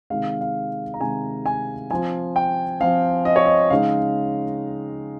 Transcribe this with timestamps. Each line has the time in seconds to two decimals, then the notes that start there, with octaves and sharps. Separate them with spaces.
0.10 C3 D#3 G#3 F5
0.41 F5
0.94 A#5
1.00 C3 D#3 G#3 G#5
1.46 G#5
1.91 F3 C4 F4 G#5
2.36 G5
2.80 F3 C4 F4 F5
3.25 D#5
3.36 C#5
3.46 D#5
3.70 C#3 G#3 D#4 F5